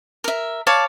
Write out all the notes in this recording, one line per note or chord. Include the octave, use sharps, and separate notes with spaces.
A#4 E5
C#5 D5 F5 A5